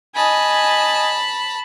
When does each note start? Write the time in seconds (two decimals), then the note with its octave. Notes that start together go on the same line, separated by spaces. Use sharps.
0.16 D#5 G#5 A5 B5